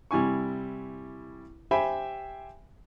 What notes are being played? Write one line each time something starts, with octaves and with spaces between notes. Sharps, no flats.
C3 G3 E4 G#5 C#6
G4 C5 E5 G5 G#5 B5